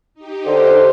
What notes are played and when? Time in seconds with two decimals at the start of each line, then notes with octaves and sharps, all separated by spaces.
0.14 D#4 G4
0.46 D3 C5